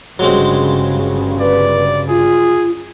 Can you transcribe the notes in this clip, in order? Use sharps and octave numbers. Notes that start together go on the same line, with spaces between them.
G1 G2 C#3 F#3 G#3 C4
B4 D5
F4 G#4